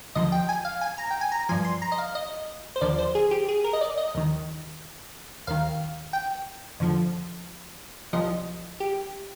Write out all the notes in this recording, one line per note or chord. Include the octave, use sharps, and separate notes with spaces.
D#2 D3 F3 D#5
G5
G#5
F5
G#5
A#5
G5
G#5
A#5
G2 F3 G#5
C6
A#5
D#5
F5
D#5
C5
D#2 D3 F3 D5
C5
G#4
G4
G#4
A#4
D#5
D5
D#5
D#2 D#3
D#2 D#3 F5
G5
F2 D3 F3
C2 A#2 F3 D#5
G4